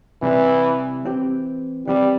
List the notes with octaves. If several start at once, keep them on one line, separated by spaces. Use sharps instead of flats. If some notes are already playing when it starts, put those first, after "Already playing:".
C3 E3 G3 E4
E3 C4 G4
E3 G3 C4 G4